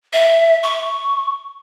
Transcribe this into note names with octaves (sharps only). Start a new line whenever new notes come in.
E5
C#6